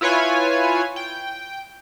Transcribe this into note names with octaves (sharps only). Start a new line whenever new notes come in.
E4 F4 B4 C#5 G#5
G5